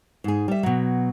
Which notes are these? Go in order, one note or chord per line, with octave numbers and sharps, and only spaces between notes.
G#2 G#4
G3 E5
B2 F#3